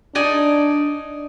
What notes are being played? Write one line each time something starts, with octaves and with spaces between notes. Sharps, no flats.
D4 D#4 D5 G#5